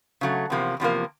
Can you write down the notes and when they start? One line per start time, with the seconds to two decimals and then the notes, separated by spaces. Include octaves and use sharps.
0.21 C#3 F#3 A3
0.50 E2 C3 F3 A#3
0.80 E2 C3 F3 A#3